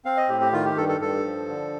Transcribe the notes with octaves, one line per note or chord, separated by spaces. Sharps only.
C4 F5
D#5
A2 G4
G4
D#3 F4
G4
G2 A4
A4
G2 A4
F3
D3